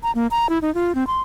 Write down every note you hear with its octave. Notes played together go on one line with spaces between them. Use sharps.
A#5
A#3
A#5
E4
D#4
F4
C4
C6